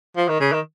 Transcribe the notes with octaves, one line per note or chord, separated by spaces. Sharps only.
F3
D#3
C#3
D#3